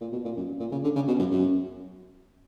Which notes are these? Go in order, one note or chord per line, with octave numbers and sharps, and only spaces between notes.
A#2
B2
A#2
F#2
A#2
C#3
D3
C#3
B2
F#2
F#2